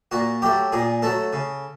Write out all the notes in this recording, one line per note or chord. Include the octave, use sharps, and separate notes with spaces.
A#2 F#4
F#3 A3 G4
A#2 G#4
F#3 A3 A4
C#3